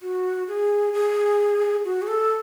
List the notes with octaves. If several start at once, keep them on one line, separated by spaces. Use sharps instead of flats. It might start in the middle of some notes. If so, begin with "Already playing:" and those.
F#4
G#4
G#4
F#4
G#4
A4